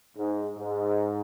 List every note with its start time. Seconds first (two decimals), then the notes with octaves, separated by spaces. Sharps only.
0.17 G#2
0.58 G#2